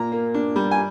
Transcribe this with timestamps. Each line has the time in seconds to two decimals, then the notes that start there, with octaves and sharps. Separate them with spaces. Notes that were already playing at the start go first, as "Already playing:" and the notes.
Already playing: A#2 A#5
0.12 A#3
0.34 D4
0.56 G3
0.71 G#5